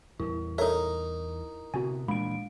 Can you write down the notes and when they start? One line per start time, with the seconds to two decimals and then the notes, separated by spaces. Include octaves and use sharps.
0.20 E2 G3 E4
0.58 D#4 A4 A#4 C#5 E5
1.74 C3 B3 F#4 G#5
2.08 A#2 E3 F3 G#3 B5 D7